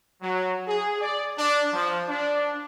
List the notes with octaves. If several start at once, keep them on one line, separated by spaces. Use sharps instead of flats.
F#3
G#4
D5
D4
F3
D4